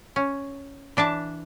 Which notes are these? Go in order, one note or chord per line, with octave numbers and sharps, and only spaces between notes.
C#4
E3 D4 E5 A5